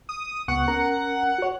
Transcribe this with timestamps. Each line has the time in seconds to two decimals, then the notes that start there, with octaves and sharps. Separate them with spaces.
0.09 D#6
0.48 C#2 B3 F#5 C#6
0.68 C#4 A#4 A#5
1.38 F#4 C#5